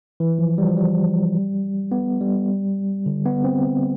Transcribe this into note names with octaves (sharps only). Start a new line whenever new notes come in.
E3
F3
G3
F3
G3
B3
G3
D3
B3
C4